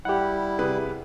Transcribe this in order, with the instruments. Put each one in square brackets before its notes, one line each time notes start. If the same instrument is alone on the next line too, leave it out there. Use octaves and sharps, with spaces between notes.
[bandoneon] G3 E4 [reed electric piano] G4 F#5
[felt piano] C3 G#4 B4